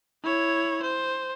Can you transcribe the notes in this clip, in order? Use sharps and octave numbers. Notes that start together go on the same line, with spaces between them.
E4 C#5
C5